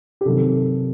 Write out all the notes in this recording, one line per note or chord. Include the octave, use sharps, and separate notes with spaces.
G4
C3 D#3 F#3 A4